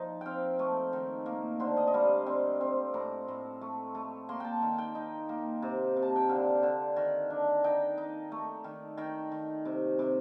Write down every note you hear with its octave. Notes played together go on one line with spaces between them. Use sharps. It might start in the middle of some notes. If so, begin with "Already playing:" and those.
Already playing: F3 D#4
C4 F5 G5
A3
D#3
A#3
D3 C5
D#5
D#5
G3 F5
C4
C4
A2 A#5
A2
A3
A3
A#3 C6
G5 A5
D#3
G5
D#4
A#3
C3
C3
A5
G5
D3 F5
D3
D#3
D4
D#4 G5
D#4
A3
D#3
D#3 G5
D#3
C3
C3